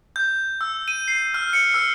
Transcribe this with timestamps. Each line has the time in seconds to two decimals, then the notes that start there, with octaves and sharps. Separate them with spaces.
0.16 G6
0.61 E6
0.88 D#7
1.08 C7
1.34 F6
1.53 C#7
1.74 E6